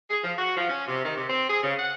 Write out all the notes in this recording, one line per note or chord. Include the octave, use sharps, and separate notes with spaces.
G#4
F3
F#4
F3
C#4
C3
D#3
C3
C4
G#4
C#3
F#5